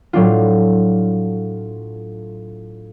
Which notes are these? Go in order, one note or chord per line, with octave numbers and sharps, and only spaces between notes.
A2 F#3 D4 F4